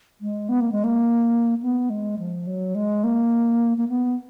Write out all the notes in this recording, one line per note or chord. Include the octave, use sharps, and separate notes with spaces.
G#3
B3
A#3
G#3
A#3
B3
G#3
F3
F#3
G#3
A#3
A#3
B3